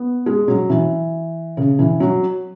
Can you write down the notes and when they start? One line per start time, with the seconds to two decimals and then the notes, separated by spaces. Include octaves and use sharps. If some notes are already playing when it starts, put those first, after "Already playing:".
Already playing: B3
0.26 G#3
0.48 F#3
0.70 E3
1.57 C#3
1.79 E3
2.00 F#3